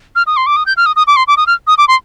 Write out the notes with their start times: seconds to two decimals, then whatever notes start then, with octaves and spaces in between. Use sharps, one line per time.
0.16 F6
0.27 D#6
0.37 C6
0.46 D6
0.56 D#6
0.66 G6
0.77 F6
0.86 D#6
0.96 D#6
1.07 D6
1.16 C6
1.27 D6
1.37 D#6
1.47 F6
1.67 D#6
1.78 D6
1.88 C6